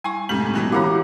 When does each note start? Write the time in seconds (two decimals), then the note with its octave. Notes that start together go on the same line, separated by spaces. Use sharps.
0.04 G3 E4 G#5 C#6
0.29 A2 C3 G#3 C#4 G4 F#7
0.54 B2 E3 F#3
0.72 E3 E4 F#4 G4 A#4 F5 F#5 A#5